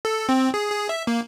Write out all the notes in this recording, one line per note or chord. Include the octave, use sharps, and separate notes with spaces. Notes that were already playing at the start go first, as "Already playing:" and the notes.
A4
C4
G#4
G#4
E5
A#3